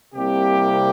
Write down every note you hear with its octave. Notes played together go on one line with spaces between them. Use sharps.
C2 C3 G3 A#3 G4